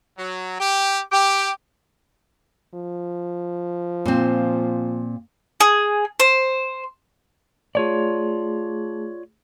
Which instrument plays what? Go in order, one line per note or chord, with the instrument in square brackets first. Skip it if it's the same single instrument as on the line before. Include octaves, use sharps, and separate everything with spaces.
[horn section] F#3
G4
G4
[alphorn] F3
[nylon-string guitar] A#2 C4
[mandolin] G#4
C5
[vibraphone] A3 G#4 [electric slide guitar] F4 C#5 D5